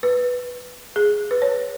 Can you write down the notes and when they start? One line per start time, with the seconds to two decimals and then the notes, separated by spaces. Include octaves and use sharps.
0.03 B4
0.96 G#4
1.31 B4
1.42 C#5